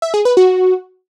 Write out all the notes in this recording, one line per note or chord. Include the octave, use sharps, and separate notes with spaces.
E5
G#4
B4
F#4